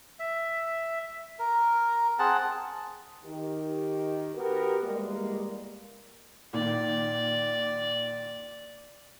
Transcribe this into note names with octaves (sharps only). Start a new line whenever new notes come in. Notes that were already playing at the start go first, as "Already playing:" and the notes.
E5
A#4
C4 G#4 F#5 A5
D#3 G4
B3 F#4 G4 A#4
E2 G3 G#3 A#3
A#2 D#3 D5